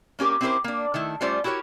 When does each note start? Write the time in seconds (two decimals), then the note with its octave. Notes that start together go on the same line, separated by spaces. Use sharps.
0.19 A#3 C#4 G4 A#4
0.41 C4 C#4 E4 G4 A#4 C5
0.64 A#3 D4
0.94 D#3 A3 E4
1.21 G3 A3 C#4 F4 C5 D5
1.44 E4 F#4 G4 A#4 C#5